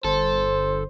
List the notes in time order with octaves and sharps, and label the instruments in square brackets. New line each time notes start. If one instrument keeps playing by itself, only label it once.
[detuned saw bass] G1 [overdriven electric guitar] A4 [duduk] C5